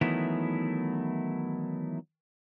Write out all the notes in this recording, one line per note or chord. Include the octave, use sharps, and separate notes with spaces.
D#3 E3 F#3 A3 B3 E4